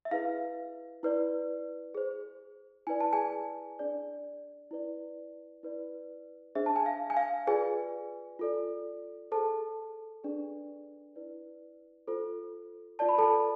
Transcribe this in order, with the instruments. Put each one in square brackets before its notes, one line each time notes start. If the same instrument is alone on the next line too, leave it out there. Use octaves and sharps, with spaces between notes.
[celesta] E5
E4 G#4 B4 F5
E4 B4 D5
G#4 C5
E4 B4 D5 G#5
A5
G#4 G#5
D4 G#4 D5
E4 B4 D5
E4 B4 D5
D4 G#4 C5 E5
A5
G#5
F5
G#5
F5
F4 G#4 B4 D5 G#5
F4 A4 D5
G#4 A4 C5 A5
D4 G#4 B4 D5
E4 B4 D5
F4 A4 C5
F4 B4 D5 A5
B5
A4 A5